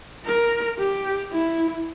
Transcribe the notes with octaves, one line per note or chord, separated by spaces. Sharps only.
A#4
G4
E4